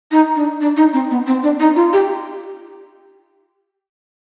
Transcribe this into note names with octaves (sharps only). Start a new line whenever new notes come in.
D#4
D4
D4
D#4
C4
B3
C4
D4
D#4
F4
G4